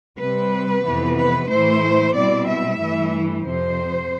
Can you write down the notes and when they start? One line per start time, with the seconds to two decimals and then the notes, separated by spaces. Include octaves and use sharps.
0.18 C3 G3 C4 B4
0.84 F2 C3 E3 B3
1.16 B4
1.49 A2 E3 A3 E4 C5
2.14 B2 G3 C4 E4 D5
2.47 E5
2.80 G2 E3 A3 E4
3.45 F2 C3 F3 C5